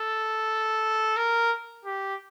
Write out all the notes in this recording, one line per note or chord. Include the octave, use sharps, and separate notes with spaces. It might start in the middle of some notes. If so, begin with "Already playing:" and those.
Already playing: A4
A#4
G4